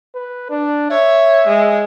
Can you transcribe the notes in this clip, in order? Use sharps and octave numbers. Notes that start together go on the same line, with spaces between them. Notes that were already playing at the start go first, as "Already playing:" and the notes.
B4
D4
C#5 E5
G#3